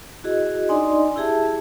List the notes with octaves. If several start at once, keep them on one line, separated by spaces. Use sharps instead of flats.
E4 F#4 G#4 D#5
D4 D#4 D5 D#5 G#5 C6
E4 G4 G#4 E5 A5